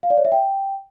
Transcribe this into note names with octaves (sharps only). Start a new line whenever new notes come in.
F5
D5
C#5
E5
G5